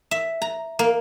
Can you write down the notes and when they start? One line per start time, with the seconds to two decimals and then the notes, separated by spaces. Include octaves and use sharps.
0.11 E5
0.42 A#5
0.79 A#3